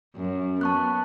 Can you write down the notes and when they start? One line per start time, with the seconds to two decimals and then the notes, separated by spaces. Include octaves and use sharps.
0.16 F#2
0.61 B3 A5 C#6 F#6